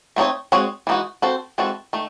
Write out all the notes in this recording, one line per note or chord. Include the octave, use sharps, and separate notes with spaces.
A3 C4 D#4 G#4 C#5
G#3 C4 F#4 C#5
E3 G#3 D#4 F#4
C4 F#4 A4 C5
E3 G#3 C4 F#4 A4
D#3 A3